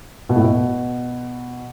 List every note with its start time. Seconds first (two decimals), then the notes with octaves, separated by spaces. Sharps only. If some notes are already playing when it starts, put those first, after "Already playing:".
0.29 B2
0.36 A2
0.44 B2